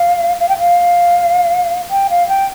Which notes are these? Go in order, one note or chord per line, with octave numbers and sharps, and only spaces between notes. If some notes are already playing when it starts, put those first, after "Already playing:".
Already playing: F5
F5
G5
F5
G5
F5
G5